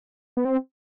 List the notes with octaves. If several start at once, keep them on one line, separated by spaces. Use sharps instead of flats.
B3
C4